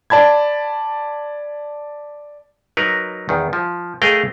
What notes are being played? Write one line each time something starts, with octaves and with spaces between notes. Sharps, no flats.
D5 A5 B5 G#6
F#3 D#4 A#4 B4
E2 D#3
F3
A3 G#4 A#4 D#5 F5 G5